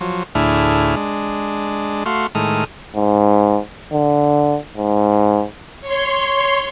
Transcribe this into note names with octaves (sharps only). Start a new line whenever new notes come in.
F3 F#3
D2 A2 D4 E4 G#4 F6
G#3 D4
A3 F#4 F5 C6
A2 D#3 G#3 A4 D#6 F6
G#2
D3
G#2
C#5 C6